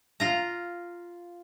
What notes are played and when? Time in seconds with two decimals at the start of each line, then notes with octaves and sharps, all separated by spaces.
0.20 F4 A#5